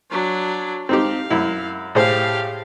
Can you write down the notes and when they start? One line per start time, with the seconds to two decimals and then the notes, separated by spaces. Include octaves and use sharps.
0.11 F#3 D4
0.89 C4 D#4 G4 F5
1.30 F#2 E4
1.95 A2 G4 G#4 C5 F5